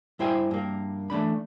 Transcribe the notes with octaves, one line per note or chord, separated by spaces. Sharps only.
G2 E4 C5 G5 G#5
G2 A#3
E3 A3 D4 B5